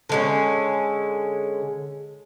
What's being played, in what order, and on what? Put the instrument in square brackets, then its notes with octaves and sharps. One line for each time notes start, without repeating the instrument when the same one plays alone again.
[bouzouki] D3 G#3 C#4